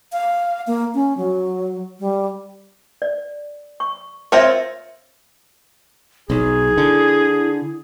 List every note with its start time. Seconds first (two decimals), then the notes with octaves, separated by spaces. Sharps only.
0.12 F5
0.67 A#3
0.94 C#4
1.17 F#3
2.00 G3
3.02 D5
3.80 C#6
4.32 C4 F4 A#4 C#5 E5
6.30 B1 D#4 G#4
6.78 D3 E4